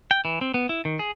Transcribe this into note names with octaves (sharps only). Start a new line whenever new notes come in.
G5
E3
C4
B3
E4
D#3
G#4